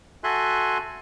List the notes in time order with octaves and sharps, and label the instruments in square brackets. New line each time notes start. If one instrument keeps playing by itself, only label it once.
[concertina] F#4 A4 E5 G#5 C6 F#6